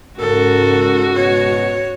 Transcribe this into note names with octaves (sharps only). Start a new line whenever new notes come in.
G#2 C#3 F#4 A4 A#4
B2 C#5